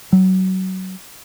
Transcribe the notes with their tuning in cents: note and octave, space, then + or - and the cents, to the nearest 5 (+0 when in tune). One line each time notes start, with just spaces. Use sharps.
F#3 +25